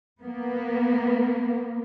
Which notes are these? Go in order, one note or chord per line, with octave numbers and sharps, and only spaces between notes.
A#3 B3